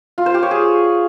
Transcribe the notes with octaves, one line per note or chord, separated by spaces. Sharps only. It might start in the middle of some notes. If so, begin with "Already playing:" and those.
F4
C5
G4
C#5
G#4